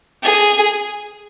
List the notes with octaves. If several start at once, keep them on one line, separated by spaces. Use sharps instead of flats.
G#4